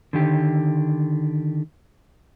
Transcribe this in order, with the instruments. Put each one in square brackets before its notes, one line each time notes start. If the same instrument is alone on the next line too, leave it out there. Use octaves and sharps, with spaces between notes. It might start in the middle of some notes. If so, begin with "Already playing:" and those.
[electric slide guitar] D3 D#3 G4